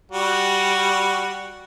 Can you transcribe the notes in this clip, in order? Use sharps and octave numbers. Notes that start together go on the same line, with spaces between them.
G3 F#4